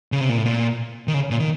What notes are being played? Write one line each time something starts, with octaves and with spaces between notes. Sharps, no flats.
C#3
C3
A#2
A2
A#2
D#3
C#3
A#2
D#3